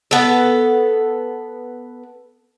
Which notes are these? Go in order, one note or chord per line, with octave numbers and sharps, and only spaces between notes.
B3 A4